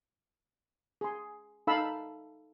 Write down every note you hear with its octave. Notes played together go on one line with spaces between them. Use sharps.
G#4 C6
D#4 A4 F5 A5 B5 E6